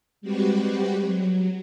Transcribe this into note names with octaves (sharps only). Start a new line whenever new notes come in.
G3 G#3 C4 F#4 G4 B4
F#3